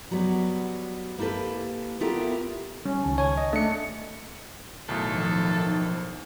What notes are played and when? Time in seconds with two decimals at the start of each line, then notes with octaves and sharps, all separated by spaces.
0.11 F#3 G3 B3
1.18 A#3 E4 G4 A4 B4
2.00 B3 E4 F4 G4 A4 A#4
2.86 G3 C#4
3.04 C#2 D#3 A5
3.18 C#5 G#5
3.38 D#5
3.53 A3 D4 C#7
4.89 B1 A2 D#3 A4
5.15 F3